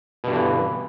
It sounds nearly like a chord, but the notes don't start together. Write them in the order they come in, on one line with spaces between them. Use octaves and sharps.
B2 G2 D3 E3